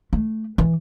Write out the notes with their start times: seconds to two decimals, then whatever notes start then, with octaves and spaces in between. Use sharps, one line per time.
0.13 A3
0.58 E3